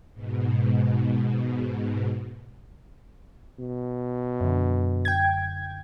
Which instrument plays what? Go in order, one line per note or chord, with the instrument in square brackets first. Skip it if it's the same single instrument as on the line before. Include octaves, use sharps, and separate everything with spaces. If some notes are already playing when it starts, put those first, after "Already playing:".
[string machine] G#2 B2
[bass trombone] B2
[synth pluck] F#2 D3
G5 G#6